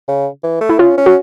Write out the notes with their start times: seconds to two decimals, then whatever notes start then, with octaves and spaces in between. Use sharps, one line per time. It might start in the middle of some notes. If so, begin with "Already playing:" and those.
0.08 C#3
0.43 E3
0.61 A3
0.69 E4
0.79 C#4 F4
0.97 C#4
1.06 F#4